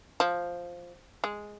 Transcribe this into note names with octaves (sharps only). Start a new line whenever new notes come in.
F3
G#3